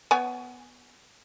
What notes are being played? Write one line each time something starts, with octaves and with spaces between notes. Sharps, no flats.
B3 C#5 G#5